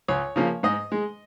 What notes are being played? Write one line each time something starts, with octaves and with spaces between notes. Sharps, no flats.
C#2 C#5
C#3 F3 A#3
G#2 D#5
G#3